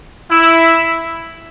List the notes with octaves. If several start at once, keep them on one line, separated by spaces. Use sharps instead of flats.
E4